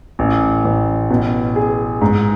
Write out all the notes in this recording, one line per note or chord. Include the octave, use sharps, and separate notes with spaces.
A1
A1
B2
G#4
G#2